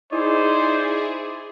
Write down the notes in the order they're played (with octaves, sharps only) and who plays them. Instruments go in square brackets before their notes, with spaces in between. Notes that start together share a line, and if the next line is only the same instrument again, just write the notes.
[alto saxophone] D#4 [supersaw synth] E4 G#4 [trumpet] C5 [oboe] D5